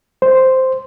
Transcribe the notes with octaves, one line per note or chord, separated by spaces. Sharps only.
C5